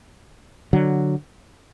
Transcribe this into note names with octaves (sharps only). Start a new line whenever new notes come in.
D3 F#3